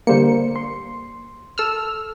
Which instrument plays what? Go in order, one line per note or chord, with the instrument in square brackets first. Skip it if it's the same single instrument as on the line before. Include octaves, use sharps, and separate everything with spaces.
[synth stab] D3 G3 C#7 [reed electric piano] A#3 C5
[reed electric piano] C6
[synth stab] A4 E6 F6